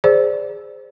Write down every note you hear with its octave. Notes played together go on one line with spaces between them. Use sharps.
G#4 C5 D5